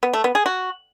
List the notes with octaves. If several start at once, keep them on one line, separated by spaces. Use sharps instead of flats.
B3
A3
B3
G#4
F#4